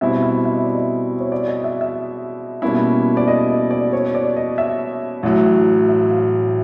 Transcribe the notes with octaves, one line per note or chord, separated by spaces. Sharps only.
B2 G3 C4 E4 E5
E5
E5
D#5
D5
D#5
C#5
D5
D#5
E5
E5
B2 G3 A#3 C#4 E4
D5
D#5
D#5
D5
C#5
D5
D#5
E5
A1 A2 F#3
E5
F5